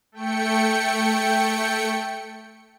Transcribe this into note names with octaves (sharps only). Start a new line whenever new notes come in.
A3 G5 C#7